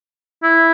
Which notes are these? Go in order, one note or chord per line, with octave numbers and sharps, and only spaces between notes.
E4